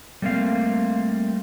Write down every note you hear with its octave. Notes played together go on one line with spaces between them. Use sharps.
G3 A3 A#3 C4 F5